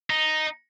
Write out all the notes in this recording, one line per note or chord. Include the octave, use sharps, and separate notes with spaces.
D#4